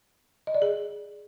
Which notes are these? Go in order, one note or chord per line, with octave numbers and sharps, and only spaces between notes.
D#5
D5
G#4